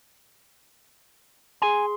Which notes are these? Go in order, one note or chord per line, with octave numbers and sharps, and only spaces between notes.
G#4 G#5 C6